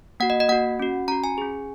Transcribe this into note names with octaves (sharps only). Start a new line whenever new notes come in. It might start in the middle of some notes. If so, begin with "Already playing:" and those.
A#3 F#4 F#5
D#5
D#5
A#3 F#4 F#5
C#4 F#4
C#4 F#4 A#5
G#5
C#4 G#4